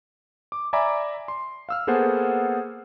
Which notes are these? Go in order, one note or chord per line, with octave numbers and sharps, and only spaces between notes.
D6
D5 E5 G#5 A#5 B5 D6
C6
F5 E6 F6
A#3 B3 G#4 A4 C5 F#5